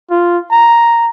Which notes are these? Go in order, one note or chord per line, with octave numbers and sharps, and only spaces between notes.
F4
A#5